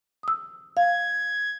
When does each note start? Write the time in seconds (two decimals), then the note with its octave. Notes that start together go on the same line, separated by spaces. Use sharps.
0.23 D#6 E6
0.77 F5 G#6